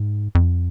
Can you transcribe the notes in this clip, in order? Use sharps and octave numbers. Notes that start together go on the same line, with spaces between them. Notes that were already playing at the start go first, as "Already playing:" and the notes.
Already playing: G#2
F2